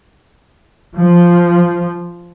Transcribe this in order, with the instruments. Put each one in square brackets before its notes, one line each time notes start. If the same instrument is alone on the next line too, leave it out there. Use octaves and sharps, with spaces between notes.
[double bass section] F3